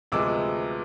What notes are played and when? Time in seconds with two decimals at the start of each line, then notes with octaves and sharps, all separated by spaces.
0.12 D2 C3 F3 G#3 B3 D6 E6